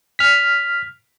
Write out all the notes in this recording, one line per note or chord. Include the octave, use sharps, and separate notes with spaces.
F6 B6